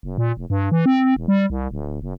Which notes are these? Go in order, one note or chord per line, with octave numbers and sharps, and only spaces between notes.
F#1
A#2
F1
G2
E3
C4
E1
G3
C2
D1
F#1